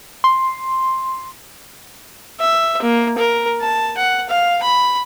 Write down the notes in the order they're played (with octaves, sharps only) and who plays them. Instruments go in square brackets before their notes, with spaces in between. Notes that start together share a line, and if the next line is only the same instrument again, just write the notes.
[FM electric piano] C6
[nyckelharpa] E5
A#3
A#4
A5
F#5
F5
B5